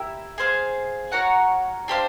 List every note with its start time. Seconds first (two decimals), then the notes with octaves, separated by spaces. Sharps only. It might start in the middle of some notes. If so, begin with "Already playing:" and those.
Already playing: E4 G4 A#4
0.38 G#4 C5 F5
1.12 F#4 A#4 C#5 F#5
1.88 D4 G4 C5 F5